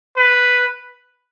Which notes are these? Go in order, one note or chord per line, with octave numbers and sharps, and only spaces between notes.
B4